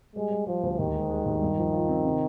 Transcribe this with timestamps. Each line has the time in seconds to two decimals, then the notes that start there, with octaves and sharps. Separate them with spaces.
0.15 G3 G#3
0.31 G3
0.47 F3 G3
0.63 D2
0.78 D#2 D#3
0.95 G#3
1.10 G#3
1.26 D#2
1.42 G2
1.58 F3
1.73 F4
1.88 C4
2.05 C3